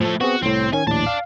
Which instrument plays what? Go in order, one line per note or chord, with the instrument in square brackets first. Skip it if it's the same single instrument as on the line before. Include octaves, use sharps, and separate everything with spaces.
[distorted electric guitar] A2 A4 [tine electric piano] F3
[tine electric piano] B3 C4 G#4 [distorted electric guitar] F#4
[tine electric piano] C2 A2 [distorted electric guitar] C4
[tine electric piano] D#3 C#4 [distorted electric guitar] G#5
[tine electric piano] A#1 D#2 A2 [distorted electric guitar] D5 A5
[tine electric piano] F5